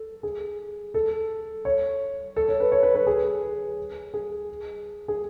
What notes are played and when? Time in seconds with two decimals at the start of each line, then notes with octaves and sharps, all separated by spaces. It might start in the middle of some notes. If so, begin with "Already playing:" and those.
Already playing: A4
0.23 G#4
0.94 A4
1.65 C#5
2.36 A4
2.48 C#5
2.60 B4
2.72 C#5
2.83 B4
2.95 B4
3.07 G#4
4.14 G#4
5.08 G#4